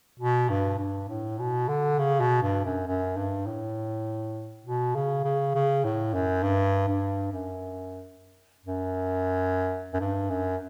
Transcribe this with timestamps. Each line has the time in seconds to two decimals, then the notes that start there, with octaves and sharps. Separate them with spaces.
0.20 B2
0.50 G2
0.79 G2
1.09 A2
1.39 B2
1.68 D3
1.98 C#3
2.20 B2
2.42 G2
2.65 F#2
2.87 F#2
3.17 G2
3.46 A2
4.65 B2
4.95 C#3
5.24 C#3
5.55 C#3
5.84 A2
6.14 F#2
6.43 G2
6.88 G2
7.32 F#2
8.66 F#2
9.93 F#2
10.00 G2
10.30 F#2